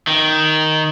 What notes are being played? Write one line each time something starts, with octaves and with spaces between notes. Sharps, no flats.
D#3